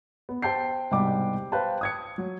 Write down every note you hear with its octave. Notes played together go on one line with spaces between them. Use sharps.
B3
C5 G5 A5 G6 C7
C2 G#2 B2 G3 G5 D6
B4 C5 F5 G5 A5
D#6 G#6 C#7
F#3